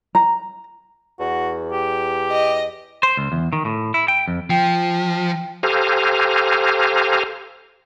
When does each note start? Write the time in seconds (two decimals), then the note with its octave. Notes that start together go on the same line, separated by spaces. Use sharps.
0.15 A#5
1.20 E2 F#4
1.71 G4
2.32 D#5
3.03 C5
3.17 C#2
3.32 E2
3.53 D#3
3.65 A2
3.94 E4
4.08 G5
4.28 F2
4.50 F3 G5
5.63 G4 A4 C5 F5 G#5 A#5